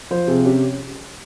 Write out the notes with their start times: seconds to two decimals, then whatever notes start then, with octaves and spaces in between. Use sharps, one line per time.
0.11 F3 C5
0.27 C3 G#4
0.45 C#4 G4